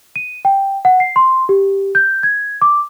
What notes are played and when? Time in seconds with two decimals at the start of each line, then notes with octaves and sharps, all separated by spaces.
0.16 D#7
0.45 G5
0.85 F#5
1.00 C7
1.16 C6
1.49 G4
1.95 G6
2.23 G#6
2.62 D6